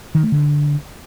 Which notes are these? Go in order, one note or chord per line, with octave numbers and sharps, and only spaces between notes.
D#3
A3
D3